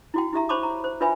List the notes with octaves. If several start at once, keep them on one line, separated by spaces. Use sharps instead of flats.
E4 F#4 G5
E4 G4 E5 A#5
C5 C#5 A5 B5 C#6 D6
A#5
C5
F4 B4 C#5 E5 G#5 B5